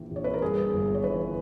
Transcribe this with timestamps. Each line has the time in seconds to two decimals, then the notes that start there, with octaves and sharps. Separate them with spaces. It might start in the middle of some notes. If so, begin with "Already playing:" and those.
Already playing: A#1 E3
0.11 A#1
0.16 C#5
0.24 B4
0.34 A#4
0.42 G2 G#4
0.73 G1
0.94 C#5
1.04 E3 B4